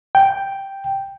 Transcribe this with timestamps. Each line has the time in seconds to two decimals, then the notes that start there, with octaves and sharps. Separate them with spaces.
0.15 G5